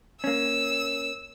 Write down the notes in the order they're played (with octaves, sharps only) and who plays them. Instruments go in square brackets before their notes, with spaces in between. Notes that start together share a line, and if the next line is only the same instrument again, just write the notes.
[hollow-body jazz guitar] A#3 C#4 [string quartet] E6